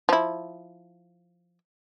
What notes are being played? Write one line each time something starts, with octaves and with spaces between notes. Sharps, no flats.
F3 E4